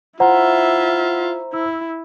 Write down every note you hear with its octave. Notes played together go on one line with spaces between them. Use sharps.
E4 F4 C5 E5 F#5 A#5
E4 E6